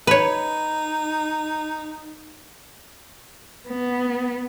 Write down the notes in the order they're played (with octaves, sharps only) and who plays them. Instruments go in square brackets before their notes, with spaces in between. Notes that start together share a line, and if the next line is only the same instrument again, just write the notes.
[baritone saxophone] D#4 [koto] B4 C#5
[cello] B3